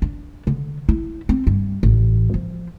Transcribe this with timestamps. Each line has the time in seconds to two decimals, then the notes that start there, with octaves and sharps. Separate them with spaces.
0.02 D4
0.47 D3
0.89 E4
1.29 C4
1.47 G2
1.83 A1
2.34 F3